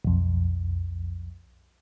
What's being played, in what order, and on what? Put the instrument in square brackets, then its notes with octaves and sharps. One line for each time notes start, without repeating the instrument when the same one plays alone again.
[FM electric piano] B1 F2